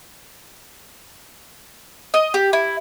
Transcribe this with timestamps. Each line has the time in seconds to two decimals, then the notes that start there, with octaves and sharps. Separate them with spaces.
2.14 D#5
2.34 G4
2.53 E4